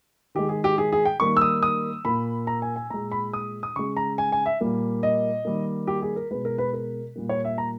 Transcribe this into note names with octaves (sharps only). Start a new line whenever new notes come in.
D#3 G#3 G4
G#4
G4
G#4
G#4
G5
D#3 G3 A#3 C#6
E6
D#6
D#6
A#2 A#3 B5
A#5
G#5
G#5
A#2 G#3 A#5
B5
D#6
D#6
C#3 G#3 C#6
A#5
G#5
G#5
E5
A#2 G3 A#3
D#5
D#3 G3 A#3
G4
G#4
A#4
B2 G#3 B4
A#4
B4
A#4
A#2 G3 A#3
C#5
E5
A#5